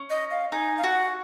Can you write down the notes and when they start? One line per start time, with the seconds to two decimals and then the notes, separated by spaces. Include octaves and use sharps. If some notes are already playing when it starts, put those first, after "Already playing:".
Already playing: C#4
0.10 D#5
0.31 F5
0.52 D#4 G#5
0.78 F5
0.84 F#4 F#5